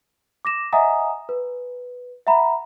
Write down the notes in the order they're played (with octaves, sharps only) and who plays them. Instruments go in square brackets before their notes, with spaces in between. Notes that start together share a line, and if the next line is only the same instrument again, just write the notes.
[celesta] D6 A#6 E7
D#5 E5 F#5 G#5 A#5 D#6
B4
E5 F#5 A#5 B5